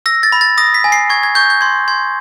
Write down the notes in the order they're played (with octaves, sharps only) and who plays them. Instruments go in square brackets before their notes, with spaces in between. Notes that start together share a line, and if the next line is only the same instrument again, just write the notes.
[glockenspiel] E6 A#6
A6
B5
A6
D#6 A#6
B6
G#5
C7
C#6 G#6
G#6
C#6 G6
G6
C6 G#6
C6 G#6